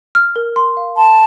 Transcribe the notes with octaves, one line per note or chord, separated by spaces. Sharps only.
F6
A#4
C6
F5
A5 C6